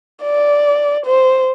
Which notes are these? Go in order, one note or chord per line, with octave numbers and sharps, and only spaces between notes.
D5
C5